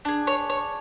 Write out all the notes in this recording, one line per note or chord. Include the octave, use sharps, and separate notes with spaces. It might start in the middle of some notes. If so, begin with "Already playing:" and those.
D4 G#4
C#5
C#5